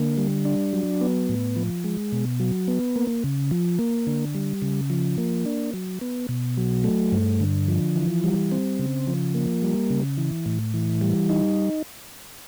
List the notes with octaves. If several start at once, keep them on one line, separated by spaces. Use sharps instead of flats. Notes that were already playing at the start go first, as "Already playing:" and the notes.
Already playing: D3 A#3
G3
D4
F#3
B3
A2
F3
G#3
B2
F#3
B3
A#3
C#3
F3
A#3
D3
G3
C#3
F3
A#3
D4
F#3
B3
B2
F#3
A3
G2
D3
F3
E3
G3
C4
C#3
F3
A#3
G3
C#3
E3
A2
E3
G3
D#4